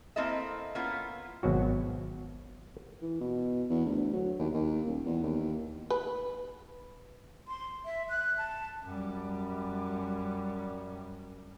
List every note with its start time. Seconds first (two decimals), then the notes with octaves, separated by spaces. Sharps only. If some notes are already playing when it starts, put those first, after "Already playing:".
0.16 A#3 C4 E4 A4 D#5 E5
0.75 A#3 B3 C#4 E4 F4
1.43 G#1 B2 F#3 F#4
3.02 E3
3.20 B2
3.70 E2
3.86 D2
4.13 F#3
4.39 D#2
4.54 D#2
4.87 D#1
5.05 E2
5.23 D#2
5.90 B4
7.48 C6
7.85 E5
8.09 F#6
8.38 A5
8.84 F#2 G3